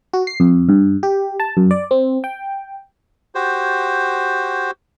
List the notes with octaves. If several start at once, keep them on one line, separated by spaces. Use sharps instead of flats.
F#4
C7
F2
G2
G4
A5
F#2
D5
C4
G5
F#4 G4 C5